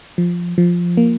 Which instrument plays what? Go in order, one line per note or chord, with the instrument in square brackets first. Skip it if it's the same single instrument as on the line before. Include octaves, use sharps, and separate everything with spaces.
[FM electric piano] F3
F3
A#3